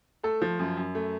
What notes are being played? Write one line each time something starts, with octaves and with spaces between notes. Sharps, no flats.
A3 A4
F3
F#2
F#2
A3